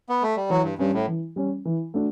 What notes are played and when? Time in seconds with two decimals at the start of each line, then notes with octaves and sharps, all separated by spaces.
0.09 B3
0.22 A3
0.37 G3
0.50 E3 F#3
0.64 G2
0.78 G2 G3 C#4
0.93 A2
1.08 E3
1.36 G3 C#4
1.65 E3
1.94 A3 D4 F#4